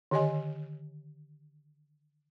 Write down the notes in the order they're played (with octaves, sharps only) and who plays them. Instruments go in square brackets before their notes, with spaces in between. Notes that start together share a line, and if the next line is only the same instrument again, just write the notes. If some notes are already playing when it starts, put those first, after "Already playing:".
[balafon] D3 D#3 G4 C#5 D#5 G#5